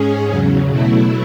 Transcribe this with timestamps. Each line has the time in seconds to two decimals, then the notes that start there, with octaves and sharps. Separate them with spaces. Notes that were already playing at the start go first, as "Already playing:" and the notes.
Already playing: G#2 G#3 C#4 G#4
0.29 E2 C#3 F#3
0.67 B2 F#3 A3 E4